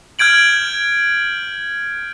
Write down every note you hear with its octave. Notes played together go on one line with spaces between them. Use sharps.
F6 G6 G#6 D7 F#7